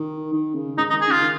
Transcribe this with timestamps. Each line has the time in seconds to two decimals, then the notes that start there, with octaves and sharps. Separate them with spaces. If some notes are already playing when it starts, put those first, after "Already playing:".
Already playing: D#3
0.33 D#3
0.55 C#3
0.77 G#2 D#4
0.90 D#4
0.93 D#3
1.01 G#4
1.08 C#3 F4
1.22 D#3